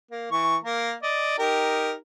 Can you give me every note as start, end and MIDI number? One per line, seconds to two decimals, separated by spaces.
0.11 0.31 58
0.32 0.56 52
0.32 0.56 85
0.64 0.93 58
0.64 0.93 70
1.03 1.35 74
1.03 1.35 75
1.38 1.94 63
1.38 1.94 67
1.38 1.94 70